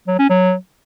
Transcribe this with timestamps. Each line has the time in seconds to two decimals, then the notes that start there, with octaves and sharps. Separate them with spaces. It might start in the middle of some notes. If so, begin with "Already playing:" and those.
0.08 F#3
0.19 C#4
0.30 F#3